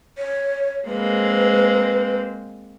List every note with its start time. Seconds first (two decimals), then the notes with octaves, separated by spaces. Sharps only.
0.18 C#5
0.87 G#3 A#3 C4 B4